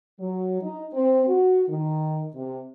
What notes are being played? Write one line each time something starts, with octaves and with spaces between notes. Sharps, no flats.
F#3
D#4
C4
F#4
D#3
C3